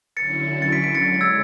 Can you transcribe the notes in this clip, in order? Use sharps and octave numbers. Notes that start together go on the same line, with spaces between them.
D3 F#3 C#4 E4 A6 C#7
A6 C#7
B6 D7
B6 D7
A6 C#7
D3 G#3 C#4
A6
E6 G#6